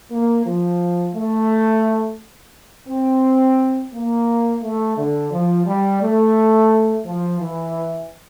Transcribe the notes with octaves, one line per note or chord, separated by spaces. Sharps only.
A#3
F3
A3
C4
A#3
A3
D3
F3
G3
A3
F3
E3